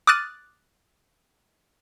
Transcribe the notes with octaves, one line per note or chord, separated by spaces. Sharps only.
D6 D#6 F6 F#6 A6 D#7